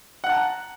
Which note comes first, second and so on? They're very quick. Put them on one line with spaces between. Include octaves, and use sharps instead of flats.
F#5 F#6 A5 A#5